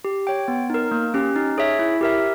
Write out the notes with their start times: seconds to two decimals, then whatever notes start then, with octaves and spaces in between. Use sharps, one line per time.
0.05 G4
0.27 C#5 G5
0.48 B3
0.70 D#4 A#4
0.91 A#3
1.14 C#4 G4
1.36 D#4
1.58 G#4 C#5 E5
1.79 E4
2.01 G4 A#4 E5